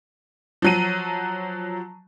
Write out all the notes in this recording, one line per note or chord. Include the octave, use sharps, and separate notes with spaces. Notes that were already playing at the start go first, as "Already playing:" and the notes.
F3 F#3 D#7